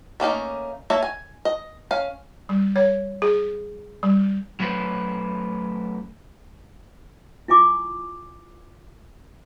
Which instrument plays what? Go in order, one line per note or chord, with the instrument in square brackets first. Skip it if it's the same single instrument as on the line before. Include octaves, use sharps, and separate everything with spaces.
[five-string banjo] A3 A#3 C#4 D#4
A#3 C#5 E5 A5
G#5
D#5
C#4 F5
[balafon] G3
C#5
G#4
G3
[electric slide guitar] F#3 A3 C#4 B4 C5
[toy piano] E4 F4 G#5 D6